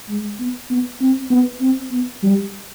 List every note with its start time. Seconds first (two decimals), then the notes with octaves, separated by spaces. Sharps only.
0.09 G#3
0.39 B3
0.70 B3
1.01 C4
1.30 B3
1.61 C4
1.92 B3
2.23 G3